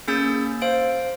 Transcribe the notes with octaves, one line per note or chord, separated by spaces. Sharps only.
A#3 C#4 G#4 E6 G6 A6
C5 F5 D7